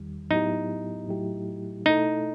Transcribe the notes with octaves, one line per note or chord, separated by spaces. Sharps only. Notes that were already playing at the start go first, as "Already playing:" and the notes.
Already playing: E2 D#3 G3
A2 F#3 B3 D#4 E4 G4
A2 F#3 A3 E4 G4
B2 A3 D#4 E4 A4